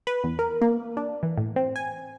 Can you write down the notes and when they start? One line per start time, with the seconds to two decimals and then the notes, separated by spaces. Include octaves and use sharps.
0.07 B4
0.24 E2
0.39 A#4
0.61 A#3
0.97 D4
1.23 E3
1.37 A2
1.56 C4
1.76 G#5